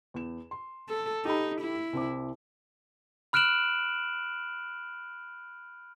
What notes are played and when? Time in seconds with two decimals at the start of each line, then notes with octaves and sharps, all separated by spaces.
0.14 E2 E7
0.51 C6
0.89 A4
1.25 D#4 G4 A4 B5
1.61 E4
1.93 C2 C4 D6
3.33 B5 F6 F#6 D7 E7 F#7